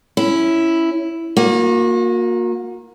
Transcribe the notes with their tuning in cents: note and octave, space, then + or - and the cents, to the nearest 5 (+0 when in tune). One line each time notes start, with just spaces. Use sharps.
C#4 +0 E4 +0
A#3 +0 F#4 -40